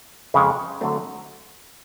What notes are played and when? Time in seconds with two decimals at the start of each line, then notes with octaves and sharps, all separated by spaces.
0.34 F2 C#3 F3 G#3
0.81 D3 F#3 A3 C4